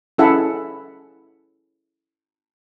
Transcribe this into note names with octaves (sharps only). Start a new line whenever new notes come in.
C#4 E4 G#4 A4 E5 F#5